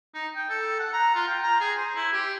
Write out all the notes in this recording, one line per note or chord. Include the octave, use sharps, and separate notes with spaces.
D#4
G5
A4
F#5
A#5
F4
G5
A#5
G#4
C5
E4
G4